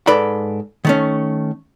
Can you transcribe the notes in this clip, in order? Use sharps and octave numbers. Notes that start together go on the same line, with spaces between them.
G#2 A4 B4 D5 B5
D#3 A3 C#4